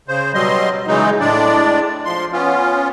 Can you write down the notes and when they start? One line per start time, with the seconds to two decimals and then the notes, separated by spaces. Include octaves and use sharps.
0.08 C#3 C5
0.34 B2 F#3 G3 D#5 C6
0.87 C#3 E3 F#3 G#3 D#4
1.20 A2 G#3 D4 D5
2.05 F3 C6
2.33 B3 C#4 F4